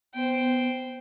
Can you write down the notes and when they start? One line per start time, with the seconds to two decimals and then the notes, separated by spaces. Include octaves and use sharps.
0.15 B3 C5 G5